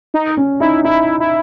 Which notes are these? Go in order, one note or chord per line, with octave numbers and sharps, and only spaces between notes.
D#4
C#4
D#4 E4
D#4 E4
E4